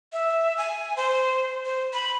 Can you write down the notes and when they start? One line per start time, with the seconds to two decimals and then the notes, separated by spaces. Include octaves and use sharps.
0.13 E5
0.57 G#5
0.97 C5
1.65 C5
1.93 B5